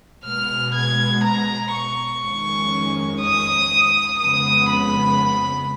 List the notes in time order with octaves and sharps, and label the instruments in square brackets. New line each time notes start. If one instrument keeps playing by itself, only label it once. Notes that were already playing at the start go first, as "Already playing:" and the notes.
[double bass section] B2 G#3 B3 [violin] F6
[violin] G#6
A#5
C#6
[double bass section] F2 D#3 G#3 C#4
[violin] D#6
[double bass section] F2 C#3 G#3 B3 [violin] D#6
[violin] B5